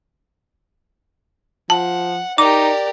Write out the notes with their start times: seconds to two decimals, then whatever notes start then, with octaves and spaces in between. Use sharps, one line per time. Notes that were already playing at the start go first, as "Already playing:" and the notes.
1.70 F3 F#5 A5
2.38 D#4 G4 A#4 D5 D6